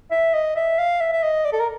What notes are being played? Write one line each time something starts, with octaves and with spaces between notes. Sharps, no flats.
E5
D#5
E5
F5
E5
E5
D#5
D5
A4
A#4